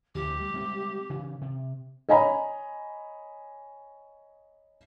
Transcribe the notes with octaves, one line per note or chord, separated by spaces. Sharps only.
D2 E3 G4
G3
G3 G#3 C4
C#3 E3
C3
C#5 D#5 G#5 A#5 B5